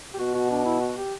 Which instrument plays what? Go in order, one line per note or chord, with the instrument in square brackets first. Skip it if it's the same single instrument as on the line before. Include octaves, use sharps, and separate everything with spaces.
[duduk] G4
[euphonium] B2 [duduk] F#4
[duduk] F#4
D4
E4
F#4
G4